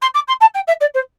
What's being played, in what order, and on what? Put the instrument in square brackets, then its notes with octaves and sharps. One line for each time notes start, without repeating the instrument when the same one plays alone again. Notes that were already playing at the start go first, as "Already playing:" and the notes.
[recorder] C6
D6
C6
A5
G5
E5
D5
C5